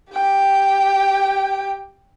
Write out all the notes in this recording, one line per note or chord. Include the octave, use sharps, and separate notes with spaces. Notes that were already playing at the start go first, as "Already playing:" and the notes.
G4 G5